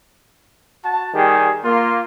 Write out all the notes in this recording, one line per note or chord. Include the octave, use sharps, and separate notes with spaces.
F#4 A5
D#3 G3 G4 G#4
A#3 F4 C6